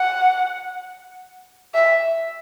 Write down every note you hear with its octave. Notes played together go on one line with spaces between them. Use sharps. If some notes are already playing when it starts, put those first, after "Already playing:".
Already playing: F#5
E5